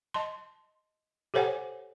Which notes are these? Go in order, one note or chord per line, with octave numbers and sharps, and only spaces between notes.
D#5 A5 C6
G4 A4 C5 C#5 F#5 G#5